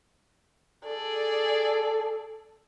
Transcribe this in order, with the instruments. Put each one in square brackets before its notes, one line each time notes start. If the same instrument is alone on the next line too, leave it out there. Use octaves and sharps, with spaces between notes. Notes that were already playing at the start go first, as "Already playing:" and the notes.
[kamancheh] G#4 D5 [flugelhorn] A4